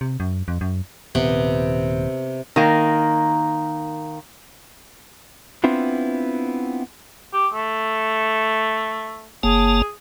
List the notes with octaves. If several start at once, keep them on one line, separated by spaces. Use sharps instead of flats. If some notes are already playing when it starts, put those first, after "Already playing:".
C3
F#2
F2
F#2
D#1 C3 B3
D#3 A#3
B3 C4 D4 E4 F4
G4
A3
F#1 A#3 G#4 A5